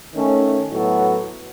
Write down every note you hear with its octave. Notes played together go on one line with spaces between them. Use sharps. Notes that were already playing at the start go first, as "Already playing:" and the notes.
D#3 A3 C#4
A2 F#3 B3 F#4 A4